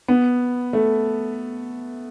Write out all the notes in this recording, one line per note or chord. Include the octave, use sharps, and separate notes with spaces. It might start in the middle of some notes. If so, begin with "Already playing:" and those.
B3
A3